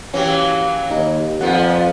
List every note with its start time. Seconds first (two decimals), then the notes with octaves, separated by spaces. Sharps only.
0.13 E3 F#3 A#3 C#4 G4
0.91 D#2 D#4
1.41 F2 A#2 F3 B3 F#5